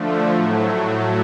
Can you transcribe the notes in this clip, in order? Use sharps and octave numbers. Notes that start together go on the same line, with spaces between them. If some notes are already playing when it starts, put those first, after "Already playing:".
Already playing: D3 F3 A3
A2 F#3 A3